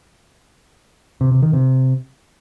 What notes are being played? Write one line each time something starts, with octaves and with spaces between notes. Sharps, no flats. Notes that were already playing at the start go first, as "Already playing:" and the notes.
C3
C3
D#3
C3